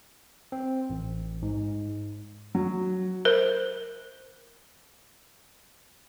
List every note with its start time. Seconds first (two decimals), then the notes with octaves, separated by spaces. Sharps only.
0.52 C4
0.90 A1
1.42 G#2
2.55 F#3
3.25 A#4 C5